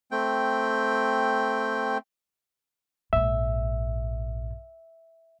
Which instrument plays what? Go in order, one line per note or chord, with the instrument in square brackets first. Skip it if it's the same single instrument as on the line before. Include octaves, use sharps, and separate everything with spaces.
[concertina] A3 C4 G5
[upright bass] A#1 G#2 [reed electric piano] E5